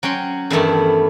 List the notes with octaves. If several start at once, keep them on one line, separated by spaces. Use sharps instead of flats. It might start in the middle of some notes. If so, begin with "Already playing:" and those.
F#3 C#4 G5 C6
E2 G2 D#3 A3 E4 A5